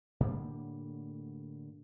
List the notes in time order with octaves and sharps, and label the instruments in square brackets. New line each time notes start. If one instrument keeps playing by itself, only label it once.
[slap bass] A2 D3 G3 A#3